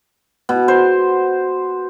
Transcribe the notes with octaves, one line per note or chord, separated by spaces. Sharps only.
B2
C5